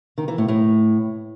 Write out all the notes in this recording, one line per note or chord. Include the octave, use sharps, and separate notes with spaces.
D#3
E3
A2
A2